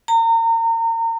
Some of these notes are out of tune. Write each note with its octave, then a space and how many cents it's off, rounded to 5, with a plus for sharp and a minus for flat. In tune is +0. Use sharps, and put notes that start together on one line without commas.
A#5 -35